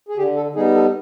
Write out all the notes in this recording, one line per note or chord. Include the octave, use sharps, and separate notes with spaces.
G#4
D3 G4
A4
G3 B3 D#4 G#4
A4